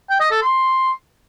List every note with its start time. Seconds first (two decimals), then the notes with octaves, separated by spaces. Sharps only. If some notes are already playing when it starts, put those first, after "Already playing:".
0.09 G5
0.20 D#5
0.31 A4
0.42 C6